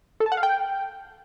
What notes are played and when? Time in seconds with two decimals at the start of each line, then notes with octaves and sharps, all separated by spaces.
0.20 A4
0.26 A5
0.32 F#5
0.37 F5
0.43 G5